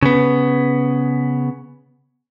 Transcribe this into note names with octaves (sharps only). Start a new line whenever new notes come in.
C#3 B3